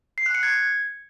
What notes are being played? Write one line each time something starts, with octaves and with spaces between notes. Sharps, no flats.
C7
F#6
C#7
G#6